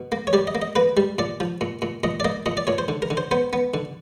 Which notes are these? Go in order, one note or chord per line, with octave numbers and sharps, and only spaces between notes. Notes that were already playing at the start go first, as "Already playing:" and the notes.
Already playing: B2
A#3
C#5
G3 D5
D#5
A#3
D#5
A#3 B4
G3
A#2 D5
F3
A#2
A#2
A#2 D#5
D5
A#3 D#5
A#2 D#5
D5
A#2 C#5
C5
D3
A#4
D3
C5
B3 C5
B3
D3